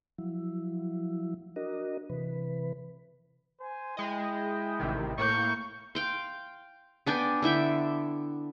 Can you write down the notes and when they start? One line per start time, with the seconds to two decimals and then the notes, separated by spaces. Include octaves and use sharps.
0.18 F3 F#3 E4
1.56 D4 F#4 A#4 D#5
2.10 C3 E3 B4
3.60 C5 G#5
3.97 G#3 E4 D#5 G5
4.80 A1 C3 D#3
5.18 A2 A#3 C#6 G6
5.95 F5 G5 C6
7.06 B3 D4 G5 G#5
7.42 D3 E4 E5 G5